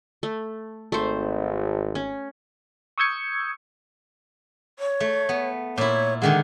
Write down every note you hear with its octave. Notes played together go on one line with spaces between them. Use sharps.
A3
G#1 A3 C5
C#4
C#6 D#6 E6 G6 G#6 C#7
C#5
A3
B3
A#2 E4 C#5
D3 D#3 G#3 F#5